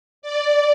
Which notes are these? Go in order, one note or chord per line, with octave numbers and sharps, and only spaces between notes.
D5